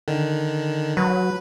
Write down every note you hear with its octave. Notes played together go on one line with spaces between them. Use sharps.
D3 D#3
F#3 B4